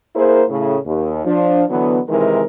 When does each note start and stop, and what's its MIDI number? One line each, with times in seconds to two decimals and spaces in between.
0.15 0.43 58
0.15 0.43 64
0.15 0.43 68
0.15 0.43 70
0.15 0.43 72
0.48 0.76 45
0.48 0.76 49
0.85 1.21 39
1.25 1.63 53
1.25 1.63 62
1.69 1.99 50
1.69 1.99 52
1.69 1.99 54
1.69 1.99 59
2.08 2.43 48
2.08 2.43 51
2.08 2.43 52
2.08 2.43 56
2.08 2.43 63
2.08 2.43 70